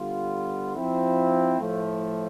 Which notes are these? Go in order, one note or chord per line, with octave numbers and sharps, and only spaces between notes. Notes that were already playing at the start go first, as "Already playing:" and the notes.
Already playing: D3 G3 B3 F4
F3 C4 E4
A2 F3 A3